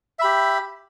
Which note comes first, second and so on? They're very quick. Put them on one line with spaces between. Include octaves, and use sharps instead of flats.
E5 B5 G4